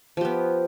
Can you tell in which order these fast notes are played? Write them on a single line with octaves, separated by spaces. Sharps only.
F3 G4 B3